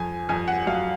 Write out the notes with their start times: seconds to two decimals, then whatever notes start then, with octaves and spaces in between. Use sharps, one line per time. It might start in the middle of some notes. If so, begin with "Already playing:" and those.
Already playing: F2 G#5
0.29 F2 G#5
0.48 F#5
0.66 F#3 F5